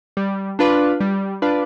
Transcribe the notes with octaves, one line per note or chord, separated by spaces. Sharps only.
G3
D4 F4 B4 D5
G3
D4 F4 B4 D5